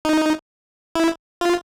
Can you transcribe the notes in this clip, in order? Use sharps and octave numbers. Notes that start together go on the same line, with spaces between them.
D#4
E4
F4